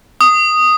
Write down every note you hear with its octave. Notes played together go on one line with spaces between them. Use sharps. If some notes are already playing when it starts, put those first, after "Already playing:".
D#6